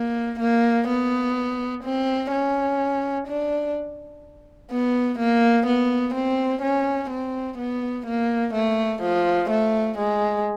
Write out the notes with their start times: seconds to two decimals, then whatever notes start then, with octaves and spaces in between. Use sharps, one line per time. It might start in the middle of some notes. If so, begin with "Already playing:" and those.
Already playing: A#3
0.40 A#3
0.88 B3
1.84 C4
2.31 C#4
3.28 D4
4.71 B3
5.19 A#3
5.67 B3
6.15 C4
6.63 C#4
7.10 C4
7.58 B3
8.07 A#3
8.54 A3
9.02 F3
9.50 A3
9.98 G#3